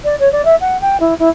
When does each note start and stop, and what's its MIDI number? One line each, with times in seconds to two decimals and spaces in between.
0.04 0.18 74
0.19 0.31 73
0.32 0.44 74
0.45 0.55 76
0.61 0.79 78
0.81 0.97 79
1.00 1.14 64
1.19 1.29 64